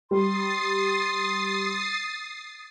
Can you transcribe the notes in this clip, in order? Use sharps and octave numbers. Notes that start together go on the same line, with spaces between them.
G3 C6 D#6 A6 C7